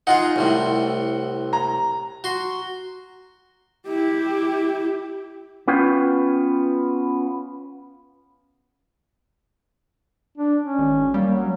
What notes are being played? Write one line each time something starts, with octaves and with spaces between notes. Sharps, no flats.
D#4 F4 G#4 F#5
C2 A2 C3
A#5
F#4 C6
E4 G4
B3 C#4 F4 B4 G5
D4
C#4
G#1
G3 A#3
F#3